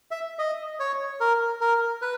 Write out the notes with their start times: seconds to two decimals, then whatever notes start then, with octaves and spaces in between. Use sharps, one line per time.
0.11 E5
0.39 D#5
0.80 C#5
1.21 A#4
1.61 A#4
2.02 B4